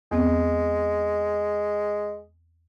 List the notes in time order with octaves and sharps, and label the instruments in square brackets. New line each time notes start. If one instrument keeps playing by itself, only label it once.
[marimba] E2 B3 C4 [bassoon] G#3